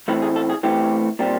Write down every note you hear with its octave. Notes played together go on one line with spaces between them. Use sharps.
A2 E3 A3 C4 B4
G#4
A4
G#4
A2 E3 A3 C4 G4
A#2 G3 C4